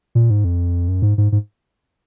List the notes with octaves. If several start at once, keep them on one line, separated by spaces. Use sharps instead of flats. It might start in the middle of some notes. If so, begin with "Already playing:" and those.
A#2
G#2
F2
F#2
G#2
G#2
G#2